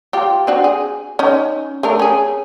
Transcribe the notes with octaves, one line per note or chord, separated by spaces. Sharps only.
F4 G4
C4 D4 F#4
G#4
C#4 D#4
A3 D4 A#4
C#4 G#4